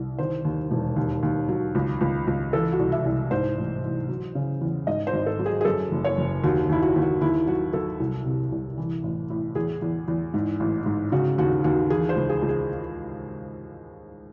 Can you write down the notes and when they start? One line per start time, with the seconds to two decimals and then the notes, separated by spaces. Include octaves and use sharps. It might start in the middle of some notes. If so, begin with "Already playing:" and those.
Already playing: C2
0.19 D#3 C5
0.45 D#2
0.71 E1
0.96 D#2
1.23 D#2
1.49 F#3
1.75 C#2
2.01 C#2
2.27 C#2
2.53 E3 A4
2.72 F#4
2.79 C2
2.92 E5
3.05 C2
3.31 G#2 C5
3.57 A1
3.83 A1
4.09 F#3
4.35 C#3
4.61 E2
4.87 G#2 D#5
5.07 C5
5.13 G#1
5.26 A4
5.39 F#3
5.46 G#4
5.61 G#4
5.65 F#2 A4
5.91 F#1
6.04 C#5
6.18 F#1
6.44 D#2 F#4
6.69 D#2 E4
6.82 F#4
6.96 D#2
7.02 F#4
7.21 D#2 E4
7.47 F#3 F#4
7.73 F#3 A4
8.00 C2
8.26 C3
8.52 C2
8.78 E3
9.03 A1
9.30 A2
9.55 E2 G#4
9.82 E2
10.08 E2
10.34 G#2
10.60 A1
10.86 G#2
11.12 C#3 F#4
11.38 D#2 F#4
11.64 D#2 F#4
11.90 E3 G#4
12.09 C5
12.16 C#2
12.29 G#4
12.42 C#2
12.49 G#4